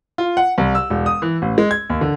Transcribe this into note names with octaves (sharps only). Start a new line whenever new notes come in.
F4
F#5
C2
E6
E1
D#6
E3
A1
G#3
G#6
D#2
D3